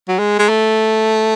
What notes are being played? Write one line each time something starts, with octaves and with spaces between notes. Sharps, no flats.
F#3
G#3
G#3
A3